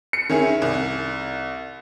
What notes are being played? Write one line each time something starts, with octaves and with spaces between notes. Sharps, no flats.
C#7
D#3 C#4 E4 G#4
C2